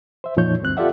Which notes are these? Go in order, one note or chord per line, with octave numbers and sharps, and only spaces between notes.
C5 E5
F2 A#2 F3 D#4 C#5 G6
D2 G2 C4 F#6
F4 G4 A4 D5 E5 F#5